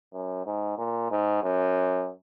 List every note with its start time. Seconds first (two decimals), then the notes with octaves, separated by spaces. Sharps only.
0.13 F#2
0.46 G#2
0.78 A#2
1.11 G#2
1.44 F#2